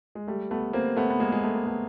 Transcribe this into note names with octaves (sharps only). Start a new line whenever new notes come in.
G#3
G3 A3
A3 B3
A#3 C4
A3 B3
B3
G#3 A#3
G#3
A3
A#3
A3 B3